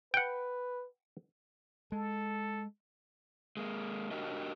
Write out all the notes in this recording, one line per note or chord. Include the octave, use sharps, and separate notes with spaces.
B4 F#5 G5
G#3 A4
G#3 A#3
D4 F#4 G4 A#4 D#5